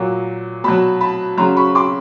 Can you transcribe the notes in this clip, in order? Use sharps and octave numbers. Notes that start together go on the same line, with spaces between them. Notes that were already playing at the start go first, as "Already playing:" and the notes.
Already playing: A#2 F#3
B2 F#3 A5 B5
A5 B5
C#3 F#3 A#5 C6
B5 C#6
C6 D6